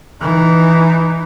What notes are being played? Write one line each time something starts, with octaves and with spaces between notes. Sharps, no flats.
E3 D#4